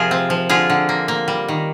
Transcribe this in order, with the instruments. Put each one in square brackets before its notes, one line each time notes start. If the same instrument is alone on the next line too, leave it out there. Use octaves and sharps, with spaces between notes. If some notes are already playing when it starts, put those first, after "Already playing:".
Already playing: [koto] C3 F3 F4 G#4 A#4
C4
F3
D3 F4 G#4
D3
A#3
A#3
G3
D#3